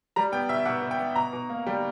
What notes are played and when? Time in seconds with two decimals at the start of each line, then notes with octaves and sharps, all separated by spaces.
0.16 G3 A#5
0.32 B3 G5
0.49 B2 E5
0.65 B2 F#5
0.82 B2
0.91 G5
0.99 B3
1.15 B2 A#5
1.33 B2
1.50 A#3
1.67 G3 G5